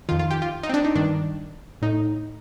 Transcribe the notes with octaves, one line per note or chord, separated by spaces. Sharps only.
F2 D#3 F4
F4
G4
F4
D#4
C4
D4
D#4
G2 D#3 D4
A2 D#4